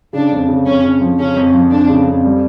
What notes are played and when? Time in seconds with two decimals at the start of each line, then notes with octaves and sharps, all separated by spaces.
0.13 C#3 D4
0.31 F2
0.48 C#3
0.66 F2 C#4
0.83 C#3
1.01 F3
1.19 C#3 C#4
1.36 F2
1.54 F3
1.71 F2 D4
1.89 C#3
2.07 F2
2.24 G3